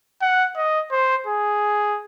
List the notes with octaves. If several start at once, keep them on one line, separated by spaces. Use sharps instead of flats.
F#5
D#5
C5
G#4